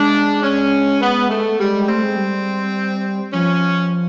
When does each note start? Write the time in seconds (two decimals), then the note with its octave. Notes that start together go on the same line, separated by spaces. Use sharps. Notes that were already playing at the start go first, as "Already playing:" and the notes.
Already playing: G#3 D4
0.43 C#4
1.01 B3
1.29 A3
1.59 G3 G#3
1.74 G#3
1.88 A3 C4
2.03 G#3
2.16 G3
3.32 F3 C#4